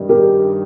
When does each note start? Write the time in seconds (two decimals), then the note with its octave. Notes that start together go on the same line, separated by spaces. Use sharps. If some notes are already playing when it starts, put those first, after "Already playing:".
Already playing: G2 D#3 G3
0.09 G4 A#4